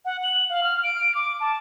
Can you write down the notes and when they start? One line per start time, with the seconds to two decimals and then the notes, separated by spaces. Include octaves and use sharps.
0.05 F#5
0.23 F#7
0.49 F5
0.63 F6
0.84 D7
1.15 D6
1.40 A5